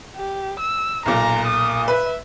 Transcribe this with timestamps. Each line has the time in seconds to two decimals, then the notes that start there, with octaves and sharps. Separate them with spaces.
0.16 G4
0.60 E6
1.06 B1 A#2 A#5
1.47 D#6
1.88 B4 E5